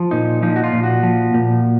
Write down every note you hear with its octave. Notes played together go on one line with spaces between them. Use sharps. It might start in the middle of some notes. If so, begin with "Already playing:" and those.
Already playing: F3
A#2 D#4
F3 D#4
F#4
F4
A#2
F#4
F3
A#2